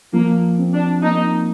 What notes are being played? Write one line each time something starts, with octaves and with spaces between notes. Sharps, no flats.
F3 A#3
C4
D4
A#3 D#4